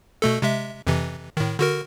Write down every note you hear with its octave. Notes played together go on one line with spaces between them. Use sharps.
B2 A3 A4
C3 G#3 E5
F2 C3 E3
A2 D#3
D3 F#4 A#4